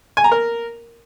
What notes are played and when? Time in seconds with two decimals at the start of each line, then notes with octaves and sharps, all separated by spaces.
0.17 G#5
0.24 A#5
0.32 A#4